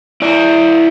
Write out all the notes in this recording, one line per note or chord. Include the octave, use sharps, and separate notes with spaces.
E4 D5